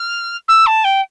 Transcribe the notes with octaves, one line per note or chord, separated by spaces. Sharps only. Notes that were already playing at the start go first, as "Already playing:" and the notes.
Already playing: F6
E6
A5
G5